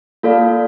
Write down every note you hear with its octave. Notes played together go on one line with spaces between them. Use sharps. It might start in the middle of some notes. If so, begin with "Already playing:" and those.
A#3 F4 A4 D5 F5